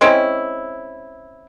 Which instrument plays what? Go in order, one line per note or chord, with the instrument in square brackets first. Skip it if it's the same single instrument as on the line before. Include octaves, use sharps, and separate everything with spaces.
[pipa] G#3 C4 C#4 E4